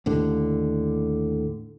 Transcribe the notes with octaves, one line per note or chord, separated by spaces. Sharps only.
D#2 A2 D3